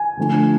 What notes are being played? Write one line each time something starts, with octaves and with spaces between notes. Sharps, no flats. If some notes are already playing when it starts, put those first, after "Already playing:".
Already playing: G#5
D3 F3 A3 D4